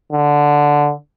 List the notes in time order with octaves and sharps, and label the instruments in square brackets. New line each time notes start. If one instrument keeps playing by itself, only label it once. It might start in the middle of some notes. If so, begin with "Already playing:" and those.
[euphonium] D3